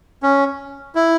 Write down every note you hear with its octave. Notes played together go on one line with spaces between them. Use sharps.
C#4
E4